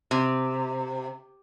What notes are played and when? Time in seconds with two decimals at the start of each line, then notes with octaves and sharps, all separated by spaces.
0.11 C3